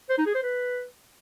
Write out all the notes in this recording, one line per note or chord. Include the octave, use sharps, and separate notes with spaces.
C5
D#4
G#4
C5
B4